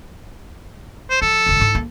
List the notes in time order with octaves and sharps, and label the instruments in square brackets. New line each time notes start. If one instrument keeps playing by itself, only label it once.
[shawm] C5
[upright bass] F3 [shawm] A4
[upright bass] F1 E2
G#2 E4
A#3